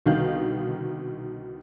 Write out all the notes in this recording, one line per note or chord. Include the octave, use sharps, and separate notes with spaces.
C2 B2 D3 D#3 F5 G6